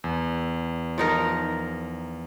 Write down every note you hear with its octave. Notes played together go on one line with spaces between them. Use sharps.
E2
F3 D#4 A#4